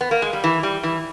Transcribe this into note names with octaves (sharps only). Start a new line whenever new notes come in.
B3
A#3
G#3
G3
E3
G3
E3